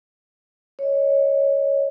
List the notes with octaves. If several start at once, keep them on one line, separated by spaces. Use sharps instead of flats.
C#5 D#5